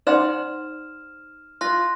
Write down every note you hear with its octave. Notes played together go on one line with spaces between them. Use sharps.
D#4 C5 D5 F#5 C6 F6 E7
F4 C6 F#6 A#6